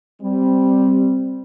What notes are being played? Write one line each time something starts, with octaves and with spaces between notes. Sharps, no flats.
G3 C4